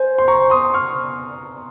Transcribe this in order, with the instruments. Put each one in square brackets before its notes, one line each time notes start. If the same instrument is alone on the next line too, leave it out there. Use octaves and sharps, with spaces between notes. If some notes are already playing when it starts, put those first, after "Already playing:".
Already playing: [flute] C5 [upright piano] G#5
[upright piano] C6
A#5 C#6
C6 D#6
C#6 F6